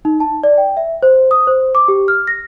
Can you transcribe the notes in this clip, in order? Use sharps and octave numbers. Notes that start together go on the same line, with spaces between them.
D#4
A5
D5
G5
E5
C5
D#6
C5
D6
G4
F6
A#6